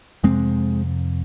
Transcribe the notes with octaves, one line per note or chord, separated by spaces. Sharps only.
F2 C3 G#3 C4